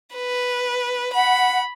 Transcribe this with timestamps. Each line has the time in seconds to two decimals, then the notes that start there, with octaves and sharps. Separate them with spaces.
0.14 B4
1.14 F#5 B5